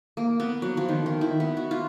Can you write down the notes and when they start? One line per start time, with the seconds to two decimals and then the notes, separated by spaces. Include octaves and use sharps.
0.17 A#3
0.40 B3
0.62 F#3
0.77 F3
0.89 D#3
1.06 D#3
1.21 E4
1.40 B3
1.57 F#4
1.71 F4